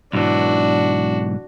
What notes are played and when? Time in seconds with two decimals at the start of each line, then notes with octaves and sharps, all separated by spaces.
0.13 B1 G#2 E3 D4 F#4